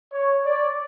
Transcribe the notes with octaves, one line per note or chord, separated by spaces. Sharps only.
C#5
D5